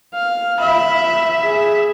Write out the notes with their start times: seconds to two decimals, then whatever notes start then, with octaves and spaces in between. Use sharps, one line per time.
0.14 F5
0.60 E5 B5
1.42 G#4